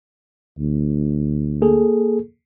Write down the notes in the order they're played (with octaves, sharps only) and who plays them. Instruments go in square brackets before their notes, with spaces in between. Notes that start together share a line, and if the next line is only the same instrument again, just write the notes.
[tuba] D2
[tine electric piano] A#3 G#4 A4